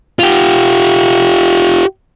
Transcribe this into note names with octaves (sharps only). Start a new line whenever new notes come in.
F4 G4